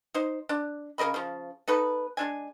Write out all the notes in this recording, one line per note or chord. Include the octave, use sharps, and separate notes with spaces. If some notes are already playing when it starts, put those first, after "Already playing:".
D#4 C5
D4
C#3 A#4 D#5 B5
C#3 F3
B3 D#4 A4 B4
G#3 D4 G#5